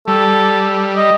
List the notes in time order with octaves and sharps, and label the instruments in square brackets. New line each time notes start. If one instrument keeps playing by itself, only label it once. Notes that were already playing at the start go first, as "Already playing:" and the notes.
[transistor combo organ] G3 [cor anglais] A4
[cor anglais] D#5